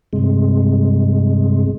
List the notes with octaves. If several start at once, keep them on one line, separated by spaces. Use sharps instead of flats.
G2 C3 G#3